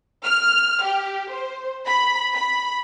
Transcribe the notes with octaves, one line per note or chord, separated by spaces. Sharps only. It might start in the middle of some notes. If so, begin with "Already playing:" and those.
F6
G4
C5
B5
B5